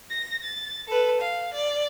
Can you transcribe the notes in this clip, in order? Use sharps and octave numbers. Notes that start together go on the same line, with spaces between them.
A#6
A6
A4 B4
F5
D5